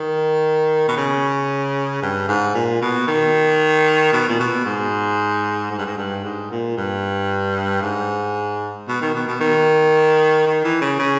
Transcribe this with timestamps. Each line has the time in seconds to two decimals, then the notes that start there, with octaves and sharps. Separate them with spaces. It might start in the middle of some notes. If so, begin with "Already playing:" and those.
Already playing: D#3
0.88 B2
0.97 C#3
2.02 G2
2.29 G#2
2.55 A#2
2.82 B2
3.08 D#3
4.13 B2
4.29 A#2
4.40 B2
4.66 G#2
5.71 G#2
5.78 G2
5.86 G#2
5.98 G2
6.24 G#2
6.51 A#2
6.77 G2
7.82 G#2
8.88 B2
9.02 D#3
9.15 B2
9.28 B2
9.40 D#3
10.47 D#3
10.64 E3
10.81 C#3
10.99 C#3